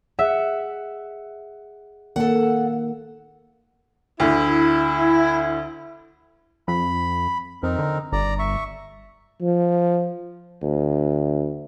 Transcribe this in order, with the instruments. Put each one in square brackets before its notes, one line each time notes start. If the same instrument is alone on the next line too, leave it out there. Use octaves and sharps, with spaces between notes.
[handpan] G#4 F#5 [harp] E5
[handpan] D#3 A#3 [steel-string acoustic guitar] A4 F#5
[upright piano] D2 D3 [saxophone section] E4
[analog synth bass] F2 [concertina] B5
[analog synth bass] F2 [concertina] C4 D#4 A#4
[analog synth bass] D3
[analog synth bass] G1 [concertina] D5 A#5
[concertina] E5 C#6
[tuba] F3
D2